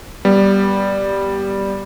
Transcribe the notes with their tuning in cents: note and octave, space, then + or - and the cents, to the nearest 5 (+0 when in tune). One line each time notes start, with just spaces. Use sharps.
G3 +0 B3 -25